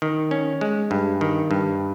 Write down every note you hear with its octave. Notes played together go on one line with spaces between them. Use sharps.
D#3
C#4
G#3
G2
D#3
G2